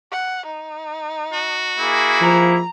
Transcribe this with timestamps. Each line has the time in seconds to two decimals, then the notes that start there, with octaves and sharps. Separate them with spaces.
0.11 F#5
0.46 D#4
1.33 F#4
1.79 A#3 E4 G#4
2.22 F3 A#5